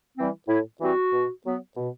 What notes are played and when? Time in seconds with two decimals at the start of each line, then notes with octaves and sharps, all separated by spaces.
0.17 E3 G3 C4
0.49 A2 E4
0.81 E3 G3 C4 F#4
1.13 B2
1.45 F#3 B3
1.77 B2